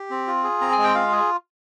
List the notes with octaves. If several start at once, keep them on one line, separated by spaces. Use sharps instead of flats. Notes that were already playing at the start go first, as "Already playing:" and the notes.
Already playing: G4
C4
F4
G#4
C4 A#5
G#5
G#3
G5
F4 F5
G#4